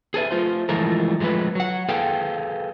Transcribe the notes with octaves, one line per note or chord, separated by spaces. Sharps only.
G#4 A4 B4 E5
A3 F4 C5
E3 F3 G#3 A3 A#4
F3 G#3 A3 F4 B4
F#3 F#5
G#4 A4 B4 F5 G5